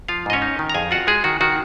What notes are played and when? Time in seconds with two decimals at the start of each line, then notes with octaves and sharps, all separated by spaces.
0.08 F3 F4 F5
0.26 G#2 D#5
0.33 C#4 C#5
0.42 D#4
0.59 D#3
0.70 A#5
0.74 F2 G#4 G#5
0.91 F4 F#4 F#5
1.07 G#3 G#4
1.24 D#3 F#4
1.41 D#3 F#4